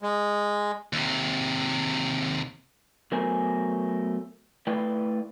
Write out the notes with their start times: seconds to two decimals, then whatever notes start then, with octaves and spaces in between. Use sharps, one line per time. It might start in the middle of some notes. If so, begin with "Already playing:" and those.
0.02 G#3
0.93 D#2 C3
3.12 F#3 A3 B3 A#4 C5 G#5
4.67 A3 E4 B4 D5 F5 G5